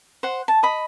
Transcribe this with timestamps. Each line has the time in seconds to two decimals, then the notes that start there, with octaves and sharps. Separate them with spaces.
0.23 C5 F#5
0.48 A5
0.63 D#5 B5